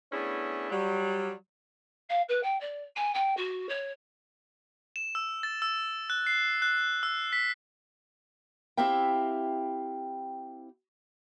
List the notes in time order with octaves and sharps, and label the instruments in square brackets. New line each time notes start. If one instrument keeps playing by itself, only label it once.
[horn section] A3 B3 C#4 D4 E4 G#4
F#3 G3
[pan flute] F5
B4
G5
D5
G#5
G5
F#4
C#5
[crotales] E7
E6
A6
E6
F#6
C7
F#6
E6
B6
[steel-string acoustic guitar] C4 E4 G4 E5 F5 G5